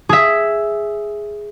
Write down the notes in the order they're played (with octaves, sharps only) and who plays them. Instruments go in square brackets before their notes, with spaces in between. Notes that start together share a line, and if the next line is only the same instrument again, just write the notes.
[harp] G#4 E5